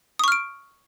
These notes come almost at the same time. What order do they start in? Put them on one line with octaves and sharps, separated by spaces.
D#6 C#6 F6 D7